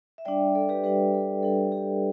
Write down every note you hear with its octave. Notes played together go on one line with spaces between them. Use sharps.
E5
G3 D4 D5 G5
A4 D5
G4 B4
G3 D4 G4 B4
A4
G3 D4 A4
G4